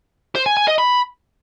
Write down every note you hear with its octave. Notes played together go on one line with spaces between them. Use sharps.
C5
G#5
G#5
D#5
B5